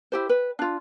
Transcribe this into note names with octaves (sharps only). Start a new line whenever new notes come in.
E4 G4 C5
B4
D4 F4